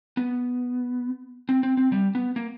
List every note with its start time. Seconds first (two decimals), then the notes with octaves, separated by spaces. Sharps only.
0.17 B3
1.49 C4
1.63 C4
1.77 C4
1.92 G3
2.15 B3
2.36 A#3